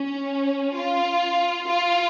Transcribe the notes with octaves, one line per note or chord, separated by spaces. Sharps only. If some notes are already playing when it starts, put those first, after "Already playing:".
Already playing: C#4
F4
F4